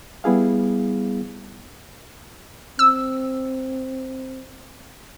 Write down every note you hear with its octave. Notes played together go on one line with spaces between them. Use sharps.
G3 B3 E4 G#4 F5
C4 E6